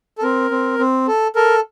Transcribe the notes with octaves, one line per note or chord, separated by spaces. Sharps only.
A4
C4 A#4
C4
C4
A4
A4 A#4